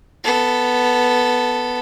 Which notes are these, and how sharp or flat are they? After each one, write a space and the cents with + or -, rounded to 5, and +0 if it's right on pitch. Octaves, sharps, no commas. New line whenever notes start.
B3 +0 A4 +0